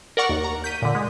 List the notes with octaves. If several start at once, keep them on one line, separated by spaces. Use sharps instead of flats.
A#4 D5 F#5 C#6
D#2
A#5
G6 B6 D#7
A#2 D3
G#3